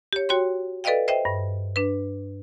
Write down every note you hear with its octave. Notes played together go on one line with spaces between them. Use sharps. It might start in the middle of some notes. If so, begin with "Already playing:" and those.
G4 C#5
F#4 C#5 G5 C6
A4 B4 D5 D#5 F5 G5
C5 D#5 E5 G5
G2
D4 B4